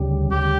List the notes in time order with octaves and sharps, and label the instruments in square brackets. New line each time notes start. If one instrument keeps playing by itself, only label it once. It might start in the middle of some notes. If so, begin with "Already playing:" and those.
Already playing: [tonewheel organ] D2 C#3 G3
[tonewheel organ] D2 C#3 G3 [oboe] G4